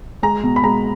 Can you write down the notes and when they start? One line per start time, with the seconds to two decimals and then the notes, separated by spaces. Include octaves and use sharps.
0.23 G#3 A#5
0.43 B2
0.56 B5
0.64 G#3 A#5